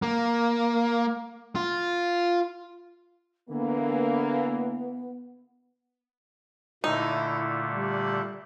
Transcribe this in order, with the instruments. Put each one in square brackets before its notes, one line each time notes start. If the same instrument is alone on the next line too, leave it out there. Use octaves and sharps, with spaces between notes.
[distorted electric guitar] A#3
F4
[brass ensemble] D3 E3 A#3 [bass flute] B3
[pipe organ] A#2 D3 A3 [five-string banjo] D#4 [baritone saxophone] E4
[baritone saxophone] G3